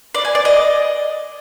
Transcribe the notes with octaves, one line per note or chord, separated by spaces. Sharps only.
D5
G#5
D5
D#5